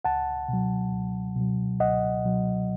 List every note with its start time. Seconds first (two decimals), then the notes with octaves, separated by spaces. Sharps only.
0.05 C#2 F#5 A5
0.48 B2 F#3
0.92 C#2
1.36 B2 F#3
1.80 C#2 D#5 F#5
2.24 B2 F#3